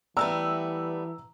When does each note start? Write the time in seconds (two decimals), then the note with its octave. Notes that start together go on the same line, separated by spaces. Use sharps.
0.17 E3 G3 A3 B3 A#5 E6